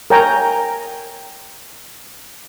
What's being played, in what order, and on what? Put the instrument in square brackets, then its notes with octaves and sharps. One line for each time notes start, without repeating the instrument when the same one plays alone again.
[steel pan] A#4 C#5 G5 G#5 A#5